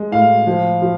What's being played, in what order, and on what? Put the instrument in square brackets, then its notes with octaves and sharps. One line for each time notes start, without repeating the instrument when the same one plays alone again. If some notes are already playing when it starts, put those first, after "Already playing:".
Already playing: [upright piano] G#3
A2 F5
F3
F3